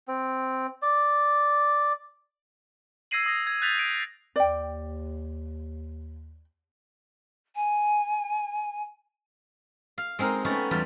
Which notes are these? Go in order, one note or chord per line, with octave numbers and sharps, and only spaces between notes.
C4
D5
E6 G#6 A#6 C7 D#7 F#7
D#6 A#6
G#6
F#6 G6 A6 B6 F7
D7
D#2 D5 G5
G#5
F5
G#3 C4 D#4 A#4
G#3 A3 B3 C#4 F#4
E2 G3 F4